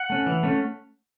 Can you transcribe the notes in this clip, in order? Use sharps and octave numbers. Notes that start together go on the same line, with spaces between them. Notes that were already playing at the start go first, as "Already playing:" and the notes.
Already playing: F#5
A3 C#4
E3
A3 C#4